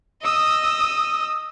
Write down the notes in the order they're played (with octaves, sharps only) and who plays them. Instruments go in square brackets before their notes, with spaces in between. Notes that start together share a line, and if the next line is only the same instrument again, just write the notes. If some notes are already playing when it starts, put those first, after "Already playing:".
[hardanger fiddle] D#5 [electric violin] D#6 E6